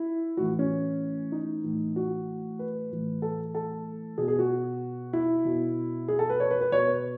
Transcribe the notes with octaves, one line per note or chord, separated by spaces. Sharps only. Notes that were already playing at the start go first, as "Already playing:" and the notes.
Already playing: E4
A2 E3 F#4
C#4
D#4
A2 E3
F#4
B4
A2 E3
A4
A4
B2 G#4
G#4
F#4
E4
B2
G#4
A4
B4
C#5
B4
B4
B2 C#5
B4